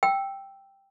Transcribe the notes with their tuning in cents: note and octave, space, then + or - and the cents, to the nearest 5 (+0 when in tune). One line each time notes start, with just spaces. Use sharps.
G5 +0 E6 +0